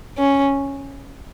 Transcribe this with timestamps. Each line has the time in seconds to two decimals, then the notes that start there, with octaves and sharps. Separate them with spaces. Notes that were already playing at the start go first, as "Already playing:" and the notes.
0.18 C#4